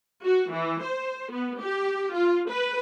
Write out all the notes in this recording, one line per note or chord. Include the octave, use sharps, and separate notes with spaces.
F#4
E3
C5
B3
G4
F4
B4